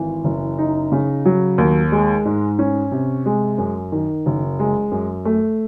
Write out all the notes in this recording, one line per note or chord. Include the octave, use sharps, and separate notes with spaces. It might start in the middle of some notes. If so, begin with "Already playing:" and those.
Already playing: G#1 E3
F#1
D#4
C#3
F#3
D#2
G#3
G#2
C#4
C3
G#3
F#2
D#3
F#1
G#3
F#2
A3